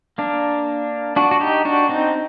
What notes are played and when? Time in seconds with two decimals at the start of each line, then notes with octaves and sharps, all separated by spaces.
0.18 A#3 D4
1.16 D4 F#4
1.31 F#4
1.41 D#4 G4
1.65 D4 F#4
1.89 C4 D#4